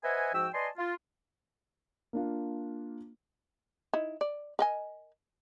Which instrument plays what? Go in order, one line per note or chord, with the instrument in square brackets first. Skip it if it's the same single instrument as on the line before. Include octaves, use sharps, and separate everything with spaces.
[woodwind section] B4 C5 D#5 E5 F#5 G#5
G#2 F3 F#4 G5 E6
B4 D5 D#5 G#5 A5 C6
F4
[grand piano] A#3 D4 F4
[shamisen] D#4 E4
D5
A#4 D#5 G#5